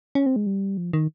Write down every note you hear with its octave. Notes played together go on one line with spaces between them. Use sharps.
C#4
C4
G#3
G3
F3
D#3